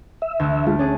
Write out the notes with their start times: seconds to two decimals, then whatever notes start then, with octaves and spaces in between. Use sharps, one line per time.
0.22 E5
0.40 D2
0.67 G#3 A3 F4
0.79 C#4 D4 G#4